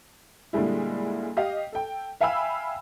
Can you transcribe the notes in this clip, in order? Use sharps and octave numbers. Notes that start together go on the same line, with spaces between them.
A#2 D3 G3 G#3 E4
G4 D#5 F5
A4 G5
E5 F5 G5 G#5 B5 E6